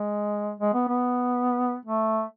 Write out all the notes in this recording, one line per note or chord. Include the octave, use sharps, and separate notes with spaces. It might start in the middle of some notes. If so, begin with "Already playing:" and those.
Already playing: G#3
G#3
B3
B3
A3